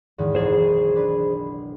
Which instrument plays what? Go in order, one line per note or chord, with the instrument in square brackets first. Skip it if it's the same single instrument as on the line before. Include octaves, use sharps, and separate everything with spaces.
[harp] E2 G#2 D#3
[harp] F#1 B1 E3 [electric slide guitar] G#4 C5
[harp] D4 B4